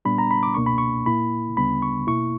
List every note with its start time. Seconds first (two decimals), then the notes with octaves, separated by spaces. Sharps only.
0.05 A#2 G3 B3 D4 B5
0.18 A#5
0.31 B5
0.43 D6
0.54 C#2 B2 A#3 D4 C#6
0.66 B5
0.78 C#6
1.06 A#2 A#3 E4 B5
1.57 D2 C#3 G3 B3 D4 B5
1.82 C#6
2.07 B2 A#3 E4 C#6